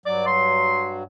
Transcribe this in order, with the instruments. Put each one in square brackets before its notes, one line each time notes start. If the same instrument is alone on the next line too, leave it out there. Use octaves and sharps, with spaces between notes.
[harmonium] G2 F#3 [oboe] D5
[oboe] C6